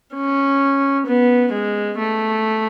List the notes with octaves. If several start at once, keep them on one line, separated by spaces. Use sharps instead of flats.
C#4
B3
G#3
A3